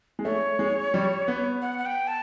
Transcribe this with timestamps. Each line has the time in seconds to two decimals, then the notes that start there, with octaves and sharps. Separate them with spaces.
0.19 G#3
0.25 A3 C#5
0.59 G#3
0.94 G3
1.28 B3
1.62 F#5
1.78 F#5
1.86 G5
2.07 A5